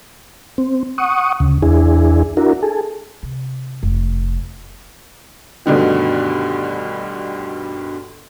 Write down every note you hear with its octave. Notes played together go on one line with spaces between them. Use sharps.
C4
F#5 C#6 D#6
D2 C#3
E2 D4 E4 G#4
D4 E4 F#4 A#4
G#4 A4
C3
F1
D2 G2 B2 D3 D#3